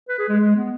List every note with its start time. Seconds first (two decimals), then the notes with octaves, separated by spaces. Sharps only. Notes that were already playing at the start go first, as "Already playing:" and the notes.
0.09 B4
0.19 G#4
0.29 G#3
0.40 G#3
0.56 B3